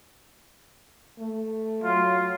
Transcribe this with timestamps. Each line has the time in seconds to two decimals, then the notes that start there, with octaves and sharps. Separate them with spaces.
1.18 A3
1.84 F#3 F4